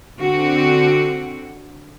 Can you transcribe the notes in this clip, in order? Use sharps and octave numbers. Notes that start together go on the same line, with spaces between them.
D3 C4 F#4